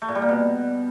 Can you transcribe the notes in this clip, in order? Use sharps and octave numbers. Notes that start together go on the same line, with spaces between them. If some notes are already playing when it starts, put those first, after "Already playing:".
A3
A#2
G3
A#3
B2